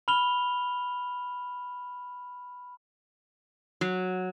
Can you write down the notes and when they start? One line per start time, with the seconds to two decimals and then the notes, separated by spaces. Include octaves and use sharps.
0.08 B5 F6 F7 G7
3.81 F#3